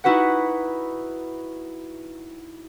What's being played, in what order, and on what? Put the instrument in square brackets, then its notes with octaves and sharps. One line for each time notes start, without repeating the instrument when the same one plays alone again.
[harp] D#4 E4 F#4 B4 F#5